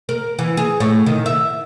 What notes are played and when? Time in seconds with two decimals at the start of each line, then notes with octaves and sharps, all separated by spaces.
0.09 A#4
0.39 E3
0.57 G#4
0.80 A2
1.06 D#3
1.26 E5